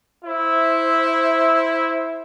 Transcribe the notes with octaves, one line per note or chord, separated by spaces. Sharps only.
E4 C5 E5